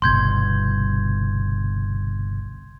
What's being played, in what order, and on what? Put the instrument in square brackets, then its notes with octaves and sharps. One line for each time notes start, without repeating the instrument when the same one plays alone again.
[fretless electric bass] G1 C2 B2 [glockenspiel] C6 G6 G#6